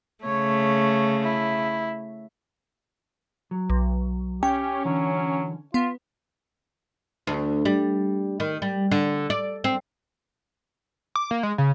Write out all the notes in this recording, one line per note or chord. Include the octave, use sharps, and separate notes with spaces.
C#3 A3 C#5
E4
F#3
B1
C#4 G4 G5
D3 E3 F#3
B3 F4
D2
G3
D#3
G3
D3
D5
C4
D6
A#3
G#3
C#3